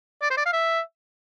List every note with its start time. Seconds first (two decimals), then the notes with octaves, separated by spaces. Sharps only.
0.22 D5
0.30 C5
0.37 D5
0.45 F5
0.52 E5